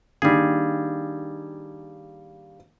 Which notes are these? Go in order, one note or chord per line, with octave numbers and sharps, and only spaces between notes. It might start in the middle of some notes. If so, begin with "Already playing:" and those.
D#3 G3 A#3 D4 G#4